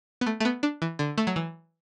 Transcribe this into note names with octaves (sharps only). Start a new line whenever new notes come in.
B3
A3
A3
B3
D4
E3
D3
A3
F#3
E3